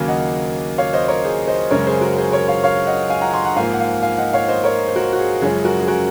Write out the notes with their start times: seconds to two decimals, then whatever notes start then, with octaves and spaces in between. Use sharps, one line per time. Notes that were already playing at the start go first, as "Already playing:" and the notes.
Already playing: D#2 C#3 F#3 A#3 F5 G#5
0.08 D#5 F#5
0.78 C#5 F5
0.93 C5 D#5
1.08 A#4 C#5
1.24 G#4 C5
1.48 C5 D#5
1.71 F#2 C#3 G#3 C#4 A#4 C#5
1.87 G#4 C5
2.01 F#4 A#4
2.17 G#4 C5
2.32 A#4 C#5
2.48 C#5 F5
2.64 C#5 F5
2.87 D#5 F#5
3.10 F5 G#5
3.21 F#5 A#5
3.33 G#5 C6
3.44 F#5 A#5
3.56 G#2 F3 A#3 F5 G#5
3.73 F#5
3.80 F5 G#5
4.03 F5 G#5
4.18 D#5 F#5
4.33 C#5 F5
4.48 C5 D#5
4.64 A#4 C#5
4.88 C5
4.96 F#4 A#4
5.13 F#4
5.19 G#4
5.41 F#2 C#3 F3 G#3 C#4 G#4
5.64 F#4 A#4
5.81 G#4
5.88 F#4 A#4